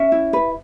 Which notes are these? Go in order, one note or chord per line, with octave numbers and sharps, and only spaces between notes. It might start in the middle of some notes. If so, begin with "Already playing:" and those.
Already playing: C#4 E5
E4
B4